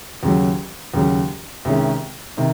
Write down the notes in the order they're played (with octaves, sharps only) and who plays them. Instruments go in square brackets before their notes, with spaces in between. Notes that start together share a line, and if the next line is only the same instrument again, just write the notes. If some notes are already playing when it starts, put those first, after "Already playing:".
[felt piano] D#2 C#3 F#3
D#2 C#3 F#3
C2 C3 D#3 G#3 C#4
C3 D#3